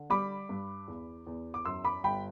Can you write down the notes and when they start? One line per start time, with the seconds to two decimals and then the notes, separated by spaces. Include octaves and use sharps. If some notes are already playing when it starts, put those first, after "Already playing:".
Already playing: D3
0.10 G3 B5 D6
0.49 G2
0.88 E2
1.27 E2
1.54 D6
1.65 F#2 C6 E6
1.84 B5 D6
2.04 G1 G5 B5